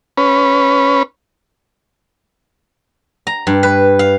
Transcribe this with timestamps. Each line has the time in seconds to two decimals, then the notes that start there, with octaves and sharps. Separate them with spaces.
0.18 C#4 B4
3.27 A#5
3.47 G2
3.63 B4
3.99 F5